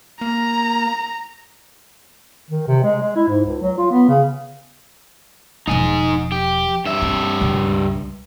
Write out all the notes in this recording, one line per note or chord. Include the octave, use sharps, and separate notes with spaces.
A#3 A#5
D#3
C3
G#3
G#3
E4
G#2
C#2
F#3
F4
B3
C#3
E1 F3 D#4 G#5
G4
G2 E5
C4
C#2 A#2